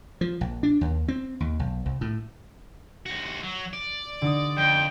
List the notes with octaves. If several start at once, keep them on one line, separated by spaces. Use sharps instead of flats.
F3
A#1
D4
D#2
C4
D#2
B1
C2
A2
D#2 F#4
F#3
D5
D3 D#4 D#6
F2 G5